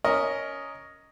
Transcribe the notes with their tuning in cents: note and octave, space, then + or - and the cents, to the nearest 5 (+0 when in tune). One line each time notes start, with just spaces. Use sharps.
C#4 +15 A#4 +0 D#5 +0